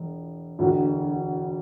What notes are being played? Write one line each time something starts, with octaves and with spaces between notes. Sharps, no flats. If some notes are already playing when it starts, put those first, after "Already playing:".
Already playing: E1
E1 D2 D3